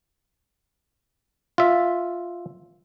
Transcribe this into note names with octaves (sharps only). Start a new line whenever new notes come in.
F4 E5